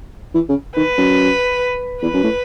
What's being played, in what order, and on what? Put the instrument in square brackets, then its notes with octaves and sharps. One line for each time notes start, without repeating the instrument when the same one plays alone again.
[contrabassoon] E3
C#3
[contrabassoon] D#3 [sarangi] B4
[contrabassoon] F#2
[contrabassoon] E2 [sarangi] B4
[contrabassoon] F#2
A2